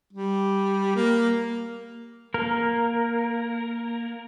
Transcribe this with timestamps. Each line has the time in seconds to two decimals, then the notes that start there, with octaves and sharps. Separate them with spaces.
0.13 G3
0.96 A#3
2.34 A#3 A#4